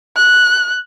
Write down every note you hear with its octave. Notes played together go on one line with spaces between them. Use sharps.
F#6